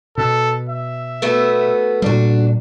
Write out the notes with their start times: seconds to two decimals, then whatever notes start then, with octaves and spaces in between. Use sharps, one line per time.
0.18 B2 A4
0.69 E5
1.22 A3 B3 F#4
2.02 A#2 G3 D4 F#4